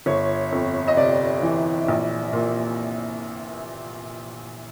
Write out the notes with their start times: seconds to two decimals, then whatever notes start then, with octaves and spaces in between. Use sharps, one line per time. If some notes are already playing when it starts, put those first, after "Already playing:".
0.06 G1 C#5
0.52 F2
0.88 D#5
0.97 C3 D5
1.42 E3
1.88 A#1
2.33 A#2